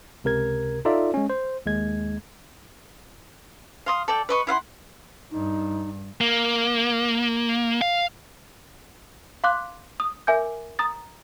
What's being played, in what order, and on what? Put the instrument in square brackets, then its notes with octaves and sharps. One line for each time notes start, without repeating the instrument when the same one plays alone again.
[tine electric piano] C#2 C3 A#4 G#6
D#4 F4 A4 D5 E5
G#3 C#4
C5
D#2 G#3 G#6
[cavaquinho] F5 C6 D#6
A4 D5 G5
B4 D#5 C#6
E4 F5 F#5 C6
[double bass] G2 [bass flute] D#4
[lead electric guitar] A#3
F5
[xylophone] F5 C6 D6 F#6
D#6
A#4 E5 G#5 D6 G6
A#5 D#6 A6